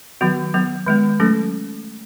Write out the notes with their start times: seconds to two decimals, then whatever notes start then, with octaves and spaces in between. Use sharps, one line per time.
0.21 D#3 F#3 B3 F#4
0.54 F#3 B3
0.87 D#3 G#3 B3
1.20 F#3 A3 C#4 A4